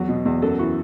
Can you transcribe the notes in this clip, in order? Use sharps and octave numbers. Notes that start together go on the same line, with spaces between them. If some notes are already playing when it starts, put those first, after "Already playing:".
Already playing: E2 F#3
B2
E2
F#2 A4
E3 F#4